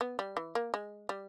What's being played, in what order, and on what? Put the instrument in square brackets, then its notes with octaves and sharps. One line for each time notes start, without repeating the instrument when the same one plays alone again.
[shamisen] B3
G3
E3
A#3
G#3
G3